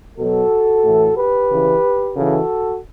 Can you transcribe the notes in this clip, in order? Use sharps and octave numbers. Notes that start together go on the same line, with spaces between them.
B2 F#3 F#4 A4
A2 E3
G4 B4
C#3 E3
C#3 E3 F#4 A4